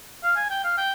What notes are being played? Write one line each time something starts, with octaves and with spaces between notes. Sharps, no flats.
F5
G#5
G5
F5
G5